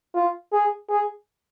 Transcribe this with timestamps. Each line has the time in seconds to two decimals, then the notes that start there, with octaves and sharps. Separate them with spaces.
0.15 F4
0.53 G#4
0.90 G#4